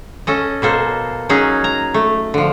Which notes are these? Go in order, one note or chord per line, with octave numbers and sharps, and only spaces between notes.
C#4 A4 D#5
B2 A#3 A4 C5
F#3 C#4 D#4 G#4
A#5
A3
D3 F3